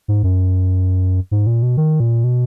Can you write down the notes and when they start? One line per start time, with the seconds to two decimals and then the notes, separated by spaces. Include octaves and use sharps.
0.08 G#2
0.23 F#2
1.31 G#2
1.47 A#2
1.62 B2
1.77 D#3
2.00 A#2
2.24 B2